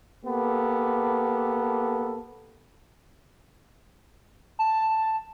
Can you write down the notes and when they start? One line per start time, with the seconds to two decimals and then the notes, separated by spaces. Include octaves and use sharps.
0.25 A#3 B3 G4 A4
4.59 A5